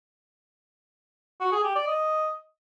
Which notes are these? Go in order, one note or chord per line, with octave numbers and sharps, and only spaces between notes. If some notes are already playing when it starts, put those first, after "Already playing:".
F#4
G#4
G4
D5
D#5